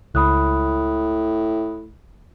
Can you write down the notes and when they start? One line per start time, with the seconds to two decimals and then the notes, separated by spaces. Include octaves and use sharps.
0.15 C#2 A2 B5 D#6 F#6